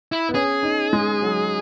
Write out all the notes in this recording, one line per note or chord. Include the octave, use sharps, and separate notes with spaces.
E4
B3
C#4 G#4
D#4
G#3
F#3